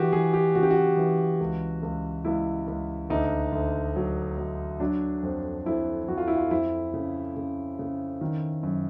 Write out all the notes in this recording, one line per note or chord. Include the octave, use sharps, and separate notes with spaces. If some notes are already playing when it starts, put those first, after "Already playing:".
Already playing: E3 F#4 G4
E3 G#4
G4
C#3 F#4
G4
F#4
E3
C#2
C#2
C#2 E4
C#2
D2 D#4
D2
F#3
F#3
F#3 D4
F2
F2 E4
F2 F#4
F4
E4
F4
F2 E4
C#3
C#3
C#3
D#3
F#2